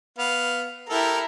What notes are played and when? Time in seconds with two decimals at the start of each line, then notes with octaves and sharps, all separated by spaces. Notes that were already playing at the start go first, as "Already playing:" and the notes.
0.18 B3 F5
0.89 E4 G4 A4 A#4 A#5